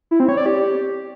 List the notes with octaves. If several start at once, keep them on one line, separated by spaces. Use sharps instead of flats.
E4
C4
C#5
D5
G4